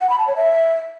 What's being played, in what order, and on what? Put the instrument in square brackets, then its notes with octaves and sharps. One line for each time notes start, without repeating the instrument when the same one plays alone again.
[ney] F#5
B5
A5
C#5
E5